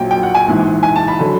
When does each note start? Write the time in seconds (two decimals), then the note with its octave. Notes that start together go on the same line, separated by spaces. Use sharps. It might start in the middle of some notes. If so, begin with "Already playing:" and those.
Already playing: A#1 A#2 F#3 G5
0.11 G5
0.23 F#5
0.35 G#5
0.48 A#1 G#2 E3
0.83 G#5
0.96 A5
1.08 B5
1.19 D3 F#3